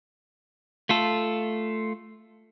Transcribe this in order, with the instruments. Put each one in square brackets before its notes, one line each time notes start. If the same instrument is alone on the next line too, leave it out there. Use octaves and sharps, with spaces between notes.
[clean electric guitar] A3 F4 A4